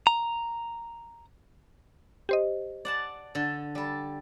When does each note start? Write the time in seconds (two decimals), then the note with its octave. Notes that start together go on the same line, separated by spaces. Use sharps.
0.07 A#5
2.29 G4 C5 D#5
2.85 D5 F#5 A5
3.35 D3 A4
3.75 G3 A4